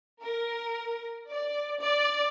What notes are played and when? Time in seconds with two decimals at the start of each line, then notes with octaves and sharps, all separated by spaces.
0.22 A#4
1.30 D5
1.82 D5